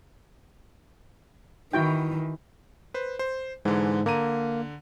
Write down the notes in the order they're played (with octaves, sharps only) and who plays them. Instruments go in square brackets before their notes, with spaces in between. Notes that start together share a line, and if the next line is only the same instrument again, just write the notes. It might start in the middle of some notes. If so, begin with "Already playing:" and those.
[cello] D#3 E3 [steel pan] E4 F#4 G5
[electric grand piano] B4 C5
C5
[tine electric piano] G#2 [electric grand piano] D3 E3
[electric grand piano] D3 A#5 D#7 [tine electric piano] A#3